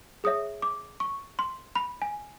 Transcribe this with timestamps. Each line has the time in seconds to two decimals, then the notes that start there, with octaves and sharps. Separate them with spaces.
0.24 G#4 C#5 E5 D#6
0.62 D6
1.00 C#6
1.39 C6
1.76 B5
2.02 G#5